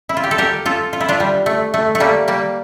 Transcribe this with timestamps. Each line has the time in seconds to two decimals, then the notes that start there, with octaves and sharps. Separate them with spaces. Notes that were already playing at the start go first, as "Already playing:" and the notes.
0.09 E4
0.17 F4
0.24 G4
0.31 A4
0.38 G4 A#4
0.66 F4 A4
0.93 F4
1.01 E4
1.08 D4 F4
1.20 G3
1.46 A3
1.74 A3
1.95 A3
2.00 G3 A#3
2.28 G3 A#3